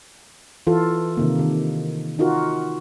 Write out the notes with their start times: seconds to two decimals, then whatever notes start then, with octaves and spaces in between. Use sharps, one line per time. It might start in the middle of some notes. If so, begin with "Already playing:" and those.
0.67 E3 F4 A4
1.17 C3 D#3 A#3
1.39 D#3
2.19 D#4 F4 F#4 A#4